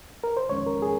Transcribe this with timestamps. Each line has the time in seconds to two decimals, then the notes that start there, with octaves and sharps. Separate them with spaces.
0.24 A#4
0.37 C5
0.49 F2 D#3 G#3 C#4 C#5
0.66 A#4
0.82 G#4